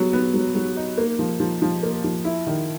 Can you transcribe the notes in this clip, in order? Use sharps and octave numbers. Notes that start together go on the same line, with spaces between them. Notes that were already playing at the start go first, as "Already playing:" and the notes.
Already playing: F#3 B3
B3
F#3
F#3
D#4
A#3
F3
F3
F3
A#3
F3
E4
D#3